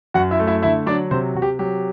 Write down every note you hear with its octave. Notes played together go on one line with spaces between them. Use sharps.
F#2 F#4 F#5
E4 E5
A3
E4 E5
D3 E4 E5
F#3 D4 D5
C3 C4 C5
C3 F#4
G4
F#3 G4